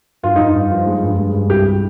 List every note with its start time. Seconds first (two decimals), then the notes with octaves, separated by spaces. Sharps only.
0.23 G2 F4
0.36 G2 D#4
0.48 F4
0.55 G2
0.71 F3
0.86 G#3
1.03 G2
1.18 G#3
1.34 G2
1.49 C2 G4